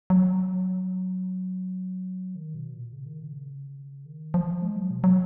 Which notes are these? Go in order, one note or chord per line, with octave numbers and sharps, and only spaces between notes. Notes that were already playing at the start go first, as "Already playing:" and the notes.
F#3
D#3
B2
A#2
C#3
D#3
C#3
D#3
F3
G#3
F#3
B2
F#3